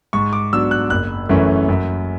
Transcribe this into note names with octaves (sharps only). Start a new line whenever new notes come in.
G#2 C#6
D6
F#3 B3 D4 E6
F#6
F#1 F#6
F#2 E3 A3 C#4
F#2